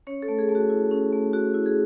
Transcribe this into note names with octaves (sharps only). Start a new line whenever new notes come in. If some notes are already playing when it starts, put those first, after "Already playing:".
C#4 C#5
A4
A3
G#4
A3
F#4
E4
C#4
A3
A3 F#4
E4
G#4